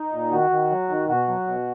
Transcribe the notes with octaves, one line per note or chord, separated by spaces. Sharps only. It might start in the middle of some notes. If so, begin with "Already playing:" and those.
Already playing: D#4
A#2
D#3 F#4
D#3
F#3
D#3
B2 F#4
F#3
B2